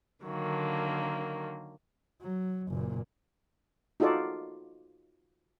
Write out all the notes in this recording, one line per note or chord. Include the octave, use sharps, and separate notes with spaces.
D3 D#3 F#3 A#3
F#3
F#1 A#2
D#4 F4 F#4 A4 D5